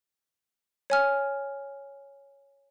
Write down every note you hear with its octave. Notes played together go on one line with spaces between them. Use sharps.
C#5 G#5 F6